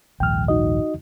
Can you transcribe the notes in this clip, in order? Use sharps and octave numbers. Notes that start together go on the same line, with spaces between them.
A#1 D#2 G#2 G5 F6
D#4 F#4 D#5